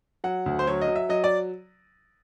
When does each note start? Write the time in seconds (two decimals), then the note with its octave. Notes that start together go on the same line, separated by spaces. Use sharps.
0.24 F#3 F#5
0.46 D2
0.59 C5
0.67 F#3 C#5
0.81 D#5
0.88 F#3
0.96 E5
1.09 F#3 D#5
1.24 D5